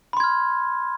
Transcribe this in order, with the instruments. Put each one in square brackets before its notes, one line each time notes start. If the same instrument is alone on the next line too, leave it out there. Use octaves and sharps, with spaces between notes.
[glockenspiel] B5
C6
G#6
F6